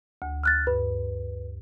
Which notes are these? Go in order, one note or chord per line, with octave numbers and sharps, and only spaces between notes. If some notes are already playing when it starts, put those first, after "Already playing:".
D2
F6 F#6 A6
G2 B4